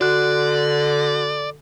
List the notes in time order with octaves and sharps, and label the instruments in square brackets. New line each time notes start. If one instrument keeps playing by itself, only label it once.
[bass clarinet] D3 [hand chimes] F#4 F#6 [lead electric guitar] D5